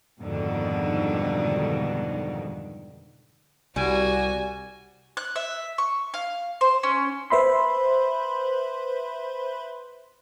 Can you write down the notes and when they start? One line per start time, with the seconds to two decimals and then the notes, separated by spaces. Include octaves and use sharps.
0.20 F2 G#2 B2 D3 D#3 G3
3.76 C2 G3 F#4 G#5
5.17 F#6
5.36 E5
5.78 C#6
6.14 F5
6.61 C5
6.83 C#4
7.30 B4 C5 E5 B5 C6